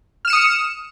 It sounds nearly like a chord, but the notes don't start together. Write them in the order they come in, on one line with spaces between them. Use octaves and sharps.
F6 E7 C#7 D#6